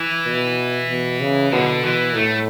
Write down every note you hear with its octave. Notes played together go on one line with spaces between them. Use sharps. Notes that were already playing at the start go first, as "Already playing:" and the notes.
Already playing: E3
B2
B2
C#3
B2 D3
B2 E3
A2 A3